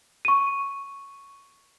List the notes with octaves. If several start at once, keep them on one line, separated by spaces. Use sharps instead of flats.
C#6 D#7